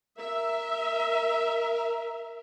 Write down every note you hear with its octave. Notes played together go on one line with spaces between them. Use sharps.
A#4 E5